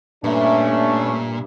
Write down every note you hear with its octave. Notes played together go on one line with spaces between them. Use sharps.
G2 A#2 A3 C#4 D4 E5